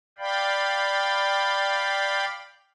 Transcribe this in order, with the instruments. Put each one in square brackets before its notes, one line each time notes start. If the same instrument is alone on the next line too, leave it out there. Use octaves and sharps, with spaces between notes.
[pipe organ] D5 F5 G5 B5